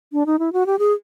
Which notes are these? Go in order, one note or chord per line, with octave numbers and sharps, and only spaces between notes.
D4
D#4
E4
F#4
G4
G#4